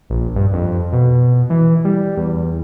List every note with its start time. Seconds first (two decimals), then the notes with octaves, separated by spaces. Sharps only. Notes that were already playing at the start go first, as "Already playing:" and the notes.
0.10 A#1
0.36 G2
0.53 F2
0.93 B2
1.50 E3
1.85 G3
2.17 E2